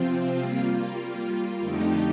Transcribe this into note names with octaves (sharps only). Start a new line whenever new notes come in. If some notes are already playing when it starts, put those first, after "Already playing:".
Already playing: C3 F3 C4 F4
G3 A#3 F4
F2 D3 A3 D#4 G4